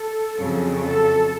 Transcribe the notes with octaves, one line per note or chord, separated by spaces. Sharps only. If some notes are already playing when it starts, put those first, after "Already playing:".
Already playing: A4
F2 C#3 F#3
A4